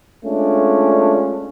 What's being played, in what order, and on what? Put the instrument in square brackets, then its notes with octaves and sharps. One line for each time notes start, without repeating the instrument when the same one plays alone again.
[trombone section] G#3 A3 C#4 D4 F4